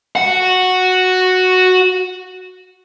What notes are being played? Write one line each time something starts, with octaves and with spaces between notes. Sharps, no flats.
F#4 F#5